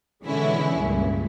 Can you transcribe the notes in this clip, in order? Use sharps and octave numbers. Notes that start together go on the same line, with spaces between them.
B2 D3 E3 G#3 C#4 E4
C#2 G2 A#2